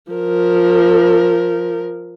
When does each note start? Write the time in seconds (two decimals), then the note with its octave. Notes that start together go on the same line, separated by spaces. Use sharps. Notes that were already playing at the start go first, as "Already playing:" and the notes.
0.11 F3 A#4